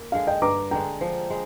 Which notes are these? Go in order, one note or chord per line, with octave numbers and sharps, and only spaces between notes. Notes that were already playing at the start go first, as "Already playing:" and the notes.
Already playing: A#3
D3 G#3 F5
D#5 G5
G2 A#5 D6
D3 G#3 G5 A#5
F3
G#3